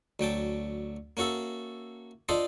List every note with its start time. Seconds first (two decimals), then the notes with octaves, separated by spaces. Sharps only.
0.19 D2 F#3 G5 A5
1.17 A#3 C#4 F#4 A4 E5
2.29 D4 F4 A4 C5 D#5